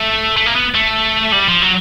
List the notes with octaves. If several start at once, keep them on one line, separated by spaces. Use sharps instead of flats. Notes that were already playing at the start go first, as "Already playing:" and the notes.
Already playing: A3
A3
A#3
B3
A3
G3
F3
F#3